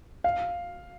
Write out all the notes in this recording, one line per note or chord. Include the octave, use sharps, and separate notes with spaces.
F5